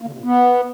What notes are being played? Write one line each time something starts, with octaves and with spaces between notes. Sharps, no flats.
A#3
D3
C3
A#2
B3